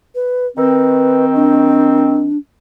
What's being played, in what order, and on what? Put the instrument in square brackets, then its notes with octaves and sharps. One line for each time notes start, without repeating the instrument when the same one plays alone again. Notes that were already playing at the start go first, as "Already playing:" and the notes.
[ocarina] B4
[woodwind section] D#3 C4 [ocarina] B4
[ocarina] D4